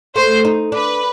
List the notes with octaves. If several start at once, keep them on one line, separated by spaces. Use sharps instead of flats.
A3 C5
D#4
D4 B4